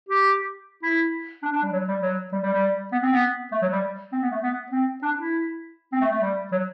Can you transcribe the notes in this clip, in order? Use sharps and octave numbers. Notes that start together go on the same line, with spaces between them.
G4
E4
D4
D4
G3
F#3
G3
F#3
G3
G3
G3
B3
C4
B3
A3
F#3
G3
C4
B3
A3
B3
C4
D4
E4
C4
A3
A3
G3
F#3